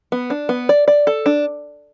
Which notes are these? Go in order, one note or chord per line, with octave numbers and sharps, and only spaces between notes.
B3
D4
B3
D5
D5
A4
D4